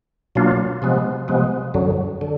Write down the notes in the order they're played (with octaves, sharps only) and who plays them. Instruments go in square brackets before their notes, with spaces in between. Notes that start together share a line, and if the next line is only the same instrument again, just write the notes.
[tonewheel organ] B2 F#3 A#3 D4 F4
C3 F3 G#3 B3
C3 F3 G#3 B3
F#2 D3 F#3
D3